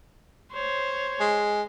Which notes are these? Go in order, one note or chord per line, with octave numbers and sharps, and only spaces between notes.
C5 C#5
G#3